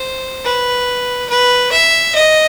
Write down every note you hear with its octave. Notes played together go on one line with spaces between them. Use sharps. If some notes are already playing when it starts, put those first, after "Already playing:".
Already playing: C5
B4
B4
E5
D#5